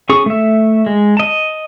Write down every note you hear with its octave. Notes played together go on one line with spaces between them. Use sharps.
C#4 G#4 C#6 D#6
A3 E5
G#3
D#5 A5